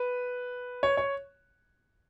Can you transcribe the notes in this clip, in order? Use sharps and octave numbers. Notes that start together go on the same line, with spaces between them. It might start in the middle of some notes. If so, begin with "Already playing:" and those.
Already playing: B4
C#5
C#5